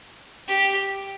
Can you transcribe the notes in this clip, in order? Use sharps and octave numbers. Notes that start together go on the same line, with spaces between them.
G4